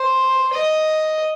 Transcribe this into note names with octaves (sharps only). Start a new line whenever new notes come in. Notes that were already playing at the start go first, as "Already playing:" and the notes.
Already playing: C5
D#5